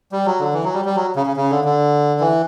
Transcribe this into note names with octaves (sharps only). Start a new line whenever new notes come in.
G3
F#3
D3
E3
F#3
G3
G3
F#3
C#3
C#3
C#3
D3
D3
E3